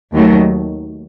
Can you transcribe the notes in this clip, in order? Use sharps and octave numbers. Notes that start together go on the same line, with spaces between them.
D#2 D#3 F#3 A3